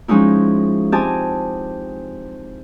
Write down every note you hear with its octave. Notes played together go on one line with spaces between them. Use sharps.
F3 G#3 C#4 D#4 E4
C4 G4 D#5 G#5 A5